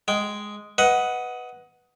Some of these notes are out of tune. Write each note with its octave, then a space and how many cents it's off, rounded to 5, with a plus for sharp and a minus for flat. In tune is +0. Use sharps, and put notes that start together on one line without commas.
G#3 +0 G5 -15
B4 +0 D#5 +20 F#5 +0